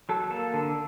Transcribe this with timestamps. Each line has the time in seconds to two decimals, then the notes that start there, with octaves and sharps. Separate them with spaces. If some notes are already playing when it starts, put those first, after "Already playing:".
0.09 F#3 A4
0.31 A#3 A4
0.54 D3